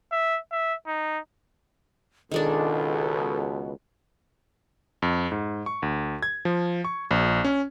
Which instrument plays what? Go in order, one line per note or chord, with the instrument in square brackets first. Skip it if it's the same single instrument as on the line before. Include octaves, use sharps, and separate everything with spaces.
[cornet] E5
E5
D#4
[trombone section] C#2 B2 [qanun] D#3 G#3 D4 [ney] A4
[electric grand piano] F2
G#2
C#6
D2
G#6
F3
C#6
A#1
C#4